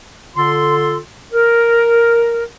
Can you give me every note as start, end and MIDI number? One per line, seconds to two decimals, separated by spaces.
0.36 0.97 50
0.36 0.97 65
0.36 0.97 69
0.36 0.97 84
1.32 2.45 70